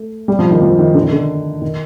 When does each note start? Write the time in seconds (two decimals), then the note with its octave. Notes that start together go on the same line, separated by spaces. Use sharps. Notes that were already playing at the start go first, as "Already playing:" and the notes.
Already playing: A3
0.28 G3
0.39 F3
0.51 D#3
0.62 F3
0.79 D#3
0.95 D3
1.03 D#3
1.12 D3
1.62 D#3